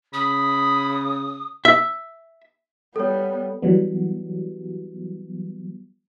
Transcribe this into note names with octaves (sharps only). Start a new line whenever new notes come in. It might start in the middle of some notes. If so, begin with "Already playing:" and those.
C#3 B5 D#6
E5
G3 B3 A4 C#5
E3 F#3 G3 B3